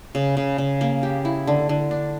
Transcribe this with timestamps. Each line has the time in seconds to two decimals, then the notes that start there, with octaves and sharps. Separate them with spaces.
0.15 C#3
0.37 C#3
0.58 C#3
0.81 A#3
1.03 G4
1.25 E4
1.47 D3
1.69 D3
1.91 D4